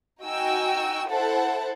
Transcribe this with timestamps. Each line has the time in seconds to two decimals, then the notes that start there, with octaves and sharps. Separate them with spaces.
0.22 D#4 F#4 G5 G#5 E6
1.09 E4 A4 C5 F#5 A5